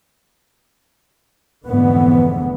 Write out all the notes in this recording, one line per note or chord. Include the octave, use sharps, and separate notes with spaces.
F1 F2 G#2 D3 E3 B3